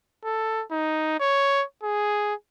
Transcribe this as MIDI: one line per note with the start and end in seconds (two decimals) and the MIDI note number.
0.24 0.63 69
0.71 1.15 63
1.20 1.63 73
1.83 2.34 68